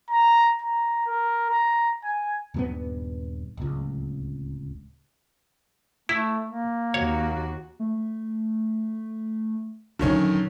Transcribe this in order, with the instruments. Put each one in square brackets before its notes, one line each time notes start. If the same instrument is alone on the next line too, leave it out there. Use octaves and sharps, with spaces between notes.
[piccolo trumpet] A#5
A#5
A#4
A#5
G#5
[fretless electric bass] D#1 G2 B3
D1 C#2
[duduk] A3 [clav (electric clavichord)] E4
[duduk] A#3
[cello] D#2 F#4 [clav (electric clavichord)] C#5
[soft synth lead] A3
[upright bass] D#1 F#3 [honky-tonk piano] D3 D#3 C#4